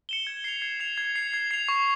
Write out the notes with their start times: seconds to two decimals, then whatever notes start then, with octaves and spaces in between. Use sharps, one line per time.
0.09 C#7 E7 G7
0.27 G#6
0.44 C7 F7
0.62 G#6
0.80 C7 F7
0.98 G#6
1.16 C7 F7
1.33 G#6
1.51 C7 F7
1.68 C#6